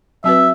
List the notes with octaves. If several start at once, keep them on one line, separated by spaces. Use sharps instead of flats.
F#3 C4 F#4 B4 E5